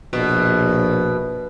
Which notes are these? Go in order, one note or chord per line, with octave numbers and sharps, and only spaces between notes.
A#1 B2